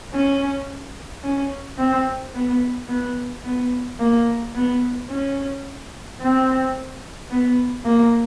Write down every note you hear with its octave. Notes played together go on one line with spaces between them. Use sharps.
C#4
C#4
C4
B3
B3
B3
A#3
B3
C#4
C4
B3
A#3